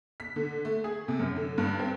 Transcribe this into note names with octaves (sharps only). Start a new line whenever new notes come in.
B6
D3
A3
G#4
C3
F#2
D3
G2
C4